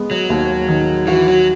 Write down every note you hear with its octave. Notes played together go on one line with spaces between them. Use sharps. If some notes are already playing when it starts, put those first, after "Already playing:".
Already playing: G#3 B3
F#3
D#2
D#3
E3 F#4
F#3